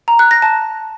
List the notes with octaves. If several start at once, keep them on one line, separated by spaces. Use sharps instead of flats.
A#5
F#6
A#6
A5